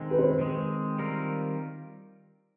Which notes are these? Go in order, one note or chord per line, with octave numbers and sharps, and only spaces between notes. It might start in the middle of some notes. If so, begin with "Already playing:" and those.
Already playing: D#3 G#3 C4
B4
C5
D#3 G#3 C4
D#3 G3 C4 F4 A#4